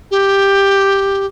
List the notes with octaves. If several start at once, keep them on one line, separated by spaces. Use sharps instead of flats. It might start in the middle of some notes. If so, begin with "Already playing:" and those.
G4